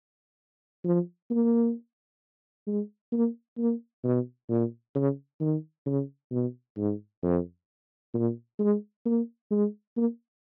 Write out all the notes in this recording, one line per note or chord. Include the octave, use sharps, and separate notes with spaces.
F3
A#3
G#3
A#3
A#3
B2
A#2
C#3
D#3
C#3
B2
G#2
F2
A#2
G#3
A#3
G#3
A#3